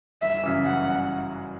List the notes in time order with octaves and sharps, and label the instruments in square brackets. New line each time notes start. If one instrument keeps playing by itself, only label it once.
[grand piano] G1 [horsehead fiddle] E5
[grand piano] F#2 C#3 E3
[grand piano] G1 [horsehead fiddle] F#5